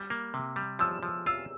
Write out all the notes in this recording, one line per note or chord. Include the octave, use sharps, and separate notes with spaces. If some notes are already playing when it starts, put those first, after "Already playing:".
Already playing: G3
A#3
C3
G3
F3 E6
F3
F4 E6